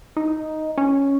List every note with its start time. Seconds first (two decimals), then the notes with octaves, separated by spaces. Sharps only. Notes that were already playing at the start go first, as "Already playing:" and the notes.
0.17 D#4
0.78 C#4